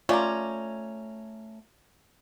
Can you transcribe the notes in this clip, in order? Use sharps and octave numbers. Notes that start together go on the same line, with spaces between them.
A3 C#4 F4 D5 A#5